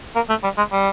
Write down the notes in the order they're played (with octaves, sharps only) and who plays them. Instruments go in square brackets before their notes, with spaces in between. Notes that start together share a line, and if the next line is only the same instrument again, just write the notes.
[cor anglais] A#3
A3
G3
G#3
G3